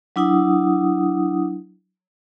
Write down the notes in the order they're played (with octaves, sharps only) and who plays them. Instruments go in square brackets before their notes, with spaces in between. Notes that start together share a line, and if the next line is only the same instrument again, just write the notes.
[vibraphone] F#3 D4 E4 F#5 D#6